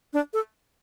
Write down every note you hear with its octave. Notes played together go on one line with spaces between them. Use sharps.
D4
A4